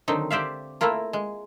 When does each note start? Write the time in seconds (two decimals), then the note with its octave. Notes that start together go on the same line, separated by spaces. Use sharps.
0.08 D3 D#3 F#3 C4 D#4
0.31 G4 C5 D5 E5 F5
0.81 A3 A#3 E4 F4 A#4
1.13 G#3